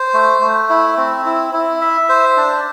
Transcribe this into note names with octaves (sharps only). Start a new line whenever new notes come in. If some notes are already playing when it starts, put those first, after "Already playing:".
Already playing: C5
A3
A3
E4
C4
E4
E4
E5
C5
D4